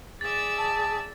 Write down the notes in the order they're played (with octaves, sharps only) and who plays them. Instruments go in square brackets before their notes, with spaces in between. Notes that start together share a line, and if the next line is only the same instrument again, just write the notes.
[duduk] G#4 [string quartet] D5 E5 E6 [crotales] A6
[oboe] A5